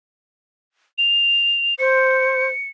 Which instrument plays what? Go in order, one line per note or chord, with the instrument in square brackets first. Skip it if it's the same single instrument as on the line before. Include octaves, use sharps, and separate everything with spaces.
[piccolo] F7
[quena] C5 [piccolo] C#7